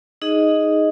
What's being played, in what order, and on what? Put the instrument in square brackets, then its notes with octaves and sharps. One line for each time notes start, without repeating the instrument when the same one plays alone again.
[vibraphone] D#4 G#4 D#5